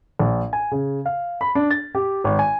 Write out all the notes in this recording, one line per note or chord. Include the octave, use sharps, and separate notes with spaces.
A#1
G#5
C#3
F5
B5
D4
A6
G4
G#1
G#5